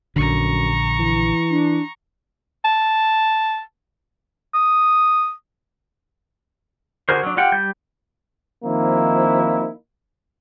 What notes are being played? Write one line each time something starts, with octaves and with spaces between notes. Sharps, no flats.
A#1 F#2 D3 A#5 C#6
E3
D4
A5
D#6
D3 F#4 G#4 A#4 C5
F#3 D4
F4 G4 F#5 G5
G3 G6
D#3 F3 A#3 C4 D#4 E4